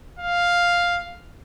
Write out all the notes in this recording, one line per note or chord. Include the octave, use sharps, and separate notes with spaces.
F5